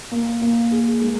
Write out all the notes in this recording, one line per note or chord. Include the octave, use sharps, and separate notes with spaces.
A#3
A#3
G#4
G#3